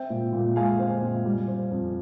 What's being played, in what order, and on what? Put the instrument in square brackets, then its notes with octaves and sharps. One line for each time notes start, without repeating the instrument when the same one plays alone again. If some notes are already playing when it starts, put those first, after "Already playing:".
Already playing: [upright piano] C4 E5 G5
A#2
A#2
G#3 F5 G#5
C4
A#2
G3
C4
F2